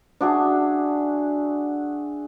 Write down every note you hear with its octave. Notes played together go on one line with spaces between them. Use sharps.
D4 F#4 G#4 E5